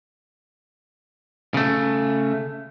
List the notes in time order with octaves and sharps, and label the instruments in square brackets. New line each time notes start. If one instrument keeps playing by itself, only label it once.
[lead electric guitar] C#3 A3